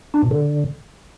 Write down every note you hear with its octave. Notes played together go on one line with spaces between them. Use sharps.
D4
B2
D3